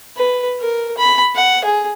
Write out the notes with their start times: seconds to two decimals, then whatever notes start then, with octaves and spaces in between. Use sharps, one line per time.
0.17 B4
0.61 A#4
0.98 B5
1.35 F#5
1.65 G#4